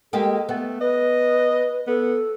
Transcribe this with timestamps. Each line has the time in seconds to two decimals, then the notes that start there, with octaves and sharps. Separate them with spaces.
0.13 G#3 A#3 G4 A4
0.49 A3 B3
0.81 B4 D#5
1.87 B3 A4